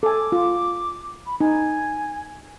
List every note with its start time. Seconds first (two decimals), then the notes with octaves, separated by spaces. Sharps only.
0.03 A4 G#5 D6
0.32 F4
1.26 B5
1.41 D#4 G#5